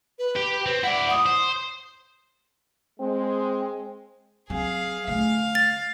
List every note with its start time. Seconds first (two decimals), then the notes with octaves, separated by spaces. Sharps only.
0.19 B4
0.36 G4
0.66 C4
0.83 E4 D5 F#5
1.10 D#6
1.26 C5
3.00 G#3 C4
4.50 F#3 C4 G#4 F5
5.07 D3 A3 F5
5.55 A6